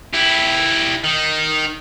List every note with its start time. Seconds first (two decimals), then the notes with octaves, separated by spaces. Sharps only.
0.14 E4 G4
1.04 D#3